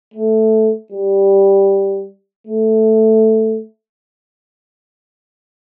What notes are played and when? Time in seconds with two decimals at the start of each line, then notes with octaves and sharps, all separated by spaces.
0.14 A3
0.92 G3
2.47 A3